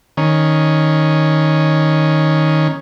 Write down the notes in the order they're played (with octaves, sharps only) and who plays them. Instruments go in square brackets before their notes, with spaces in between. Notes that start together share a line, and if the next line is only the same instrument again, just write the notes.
[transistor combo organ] D#3 C#4